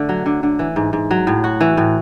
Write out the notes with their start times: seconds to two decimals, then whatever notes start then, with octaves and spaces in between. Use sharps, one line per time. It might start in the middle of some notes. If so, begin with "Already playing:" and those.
Already playing: D3 A3
0.09 F#3
0.26 D3
0.43 D3
0.59 E3
0.76 G#2
0.93 G#2
1.11 F#3
1.27 A2
1.44 F#4
1.61 E3
1.77 A2